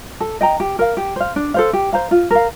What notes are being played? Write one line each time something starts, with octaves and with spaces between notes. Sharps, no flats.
A4
D#5 G5 A#5
G4
A#4 F5
G4
C5 F5
D4
A4 C5 F5
G4
C5 F5 A#5
F4
A#4 F5